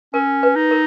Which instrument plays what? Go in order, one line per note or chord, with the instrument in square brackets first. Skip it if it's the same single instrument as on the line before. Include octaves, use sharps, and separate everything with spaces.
[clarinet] C#4 [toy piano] A#4
[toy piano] B4
[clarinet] D#4
[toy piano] A#4